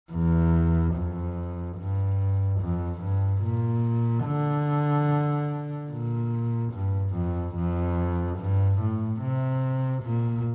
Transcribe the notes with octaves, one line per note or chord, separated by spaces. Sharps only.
E2
F2
G2
F2
G2
A#2
D3
A#2
G2
F2
F2
G2
A2
C3
A#2